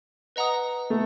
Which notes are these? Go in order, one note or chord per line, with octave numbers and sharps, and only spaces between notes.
B4 D#5 F#5 A#5 D#6
A3